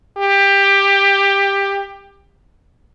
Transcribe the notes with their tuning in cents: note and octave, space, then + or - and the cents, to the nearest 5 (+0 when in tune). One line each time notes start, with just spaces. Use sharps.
G4 +15